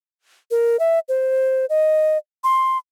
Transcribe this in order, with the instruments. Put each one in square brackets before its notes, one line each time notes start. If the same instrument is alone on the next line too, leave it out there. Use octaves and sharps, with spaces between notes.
[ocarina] A#4
E5
C5
D#5
C6